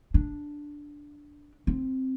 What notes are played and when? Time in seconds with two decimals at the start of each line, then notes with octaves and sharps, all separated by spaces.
0.14 D4
1.67 C4